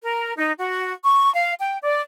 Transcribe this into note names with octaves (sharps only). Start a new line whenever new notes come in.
A#4
D#4
F#4
C#6
F5
G5
D5